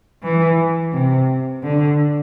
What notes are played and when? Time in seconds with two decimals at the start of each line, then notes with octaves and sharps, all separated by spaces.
0.23 E3
0.93 C3
1.63 D3